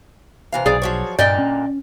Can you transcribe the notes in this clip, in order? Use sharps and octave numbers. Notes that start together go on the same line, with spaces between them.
C3 E3 F5
B1 G#4 D5
F3 F#3 C#5
G2 A#2 D3 A#3 D5 D#5 G5
C#4